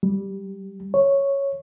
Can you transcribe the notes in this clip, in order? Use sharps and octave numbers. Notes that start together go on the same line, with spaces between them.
G3
C#5